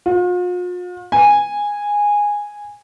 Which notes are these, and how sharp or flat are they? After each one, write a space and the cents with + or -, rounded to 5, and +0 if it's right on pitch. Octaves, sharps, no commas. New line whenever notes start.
F4 +40
G#5 -10